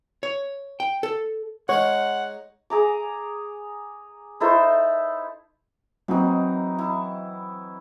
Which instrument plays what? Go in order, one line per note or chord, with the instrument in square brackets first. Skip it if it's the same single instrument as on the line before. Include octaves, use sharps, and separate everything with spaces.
[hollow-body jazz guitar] C#5
G5
A4
[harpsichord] G#3 D#4 [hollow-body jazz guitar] C#5 [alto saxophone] F#5
[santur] G#4 A#5 D6
D#4 E4 A4 C5
[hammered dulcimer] E3 D#4 [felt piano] F#3 C4
[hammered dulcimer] E4